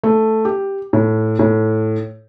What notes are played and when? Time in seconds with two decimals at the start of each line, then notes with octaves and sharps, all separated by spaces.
0.03 A3
0.45 G4
0.93 A2
1.39 A2